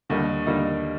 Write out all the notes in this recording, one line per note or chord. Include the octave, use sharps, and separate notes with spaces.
D#2 D3 G3 A#3 D#4
D#2 D3 G3 A#3 D#4